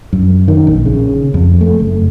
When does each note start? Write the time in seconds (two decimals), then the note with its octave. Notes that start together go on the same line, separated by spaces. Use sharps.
0.13 F#2
0.48 D#3
0.67 A#1
0.86 C#3
1.34 F2
1.61 A3
1.80 F#1